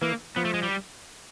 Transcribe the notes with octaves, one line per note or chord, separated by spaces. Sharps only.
E3 A#3
F3 B3
A3
G#3
G3